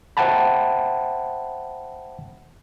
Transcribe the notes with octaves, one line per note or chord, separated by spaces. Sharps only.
C5 E5 F#5 G5 A5 B5